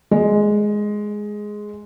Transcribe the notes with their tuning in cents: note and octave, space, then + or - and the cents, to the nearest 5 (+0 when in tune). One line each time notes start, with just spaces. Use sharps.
G#3 +5